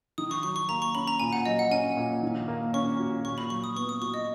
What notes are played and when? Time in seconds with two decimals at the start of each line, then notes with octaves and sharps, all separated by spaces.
0.18 D#3 D#6
0.31 C#6
0.43 F#3 C#6
0.56 C#6
0.69 A#3 A#5
0.82 C#6
0.95 C#4 B5
1.08 A#5
1.20 A#2 G#5
1.33 F#5
1.46 F#3 D#5
1.59 F#5
1.71 C#4 G#5
1.97 A#2
2.23 D#3
2.48 A#3
2.74 C#4 C#6
2.99 F#4
3.25 A#2 C#6
3.38 B5
3.50 F#3 C#6
3.64 D#6
3.76 B3 C#6
3.89 D#6
4.02 F#4 C#6
4.14 D#5